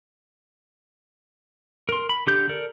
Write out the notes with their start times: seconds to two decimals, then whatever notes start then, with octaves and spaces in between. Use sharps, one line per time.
1.89 A#4 C6
2.09 B5
2.27 D3 G4 G6
2.49 A4 A#4 D5